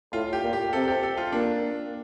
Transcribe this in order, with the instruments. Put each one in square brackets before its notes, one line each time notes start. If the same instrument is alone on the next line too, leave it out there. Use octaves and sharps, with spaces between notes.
[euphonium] A2 [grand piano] F4
[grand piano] G4
[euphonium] A#2
[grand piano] G4
[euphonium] C3 [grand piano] A4
[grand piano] G4
A4
F4
[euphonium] A#3 [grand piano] D4